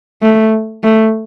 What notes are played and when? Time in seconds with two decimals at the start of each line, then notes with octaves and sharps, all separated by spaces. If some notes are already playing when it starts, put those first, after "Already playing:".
0.22 A3
0.84 A3